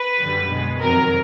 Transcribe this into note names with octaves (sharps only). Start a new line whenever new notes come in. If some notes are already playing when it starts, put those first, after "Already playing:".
Already playing: B4
F#2 D3 G3
B2
G#3
F2 C3 D#3 F#3 A#4